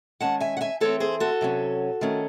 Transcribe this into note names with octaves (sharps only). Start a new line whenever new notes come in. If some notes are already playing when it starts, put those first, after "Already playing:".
D#3 G#3 C#4 F#5 A5
E5 G#5
F#5
E5 G#5
E3 A3 C4 A4 C#5
G#4 C5
F#4 A4
C3 F#3 C#4
D#3 A3 C#4